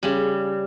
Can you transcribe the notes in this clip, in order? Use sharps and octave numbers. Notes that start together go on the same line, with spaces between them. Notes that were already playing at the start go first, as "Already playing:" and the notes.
C#3 G3